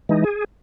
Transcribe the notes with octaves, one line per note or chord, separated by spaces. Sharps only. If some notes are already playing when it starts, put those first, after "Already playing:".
E3 G#3 D#4
G#4